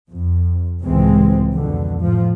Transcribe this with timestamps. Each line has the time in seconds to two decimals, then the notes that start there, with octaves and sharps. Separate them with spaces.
0.11 F2
0.83 C#2 A2 C3 E3 G#3 C4
1.53 F2 B2 D3
2.01 A2 F3